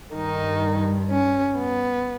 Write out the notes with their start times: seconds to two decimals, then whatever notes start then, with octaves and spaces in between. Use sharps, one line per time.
0.14 G2 D#3 G3 D#4
1.09 C#4
1.55 B3